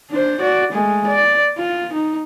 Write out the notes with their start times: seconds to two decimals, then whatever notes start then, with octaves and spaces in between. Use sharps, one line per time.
0.11 D4 C5
0.40 F#4 D5
0.73 G#3 A3
1.07 D5
1.57 F4
1.93 D#4